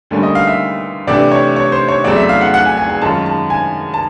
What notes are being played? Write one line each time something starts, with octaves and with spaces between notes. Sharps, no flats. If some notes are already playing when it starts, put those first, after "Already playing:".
D2 D3 G3 A#3 C#4
D#5
F5
E5
C3 E3 A3 D4 G4 D5
C#5
C#5
C5
C#5
E2 C#3 F#3 A3 C4 D5
E5
F5
F#5
F#5
G#5
G#5
G#5
F#2 D#3 G#3 C#4 F4 A5
A5
G#5
A5